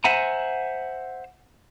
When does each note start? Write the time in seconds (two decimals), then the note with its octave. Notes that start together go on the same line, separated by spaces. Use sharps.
0.04 C5 E5 F#5 G#5 A#5